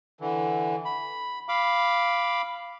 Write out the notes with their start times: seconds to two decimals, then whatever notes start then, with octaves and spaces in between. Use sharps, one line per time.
0.21 D3 E3
0.85 B5
1.49 F5 B5 D6